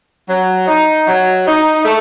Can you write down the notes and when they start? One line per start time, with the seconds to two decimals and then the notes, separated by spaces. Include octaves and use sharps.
0.28 F#3
0.68 D#4
1.07 F#3
1.46 D#4
1.84 A3